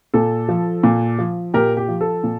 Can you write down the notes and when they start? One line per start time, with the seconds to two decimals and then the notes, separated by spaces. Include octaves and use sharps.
0.14 A#2 A4
0.49 F3
0.83 A#2
1.18 F3
1.54 A#2 G4 A#4
1.77 G4
1.88 F3
2.01 A4
2.24 A#2